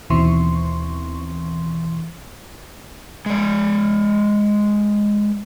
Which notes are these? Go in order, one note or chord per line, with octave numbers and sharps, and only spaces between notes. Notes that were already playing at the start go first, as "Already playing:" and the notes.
D#2 B2 E3 C4 C6 C#6
G#3 D5